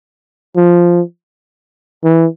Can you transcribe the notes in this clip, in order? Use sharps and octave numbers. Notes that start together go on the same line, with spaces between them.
F3
E3